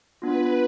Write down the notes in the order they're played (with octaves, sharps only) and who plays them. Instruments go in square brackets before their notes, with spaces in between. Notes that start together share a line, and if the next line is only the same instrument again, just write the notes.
[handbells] B3 D4 F4 [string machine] B4